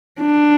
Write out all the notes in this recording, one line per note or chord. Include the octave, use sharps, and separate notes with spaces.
D4